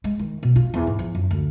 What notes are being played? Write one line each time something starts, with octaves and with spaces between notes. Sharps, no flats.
G#3
D#3
B2
F4
E2
G#2
F3
F#2
D2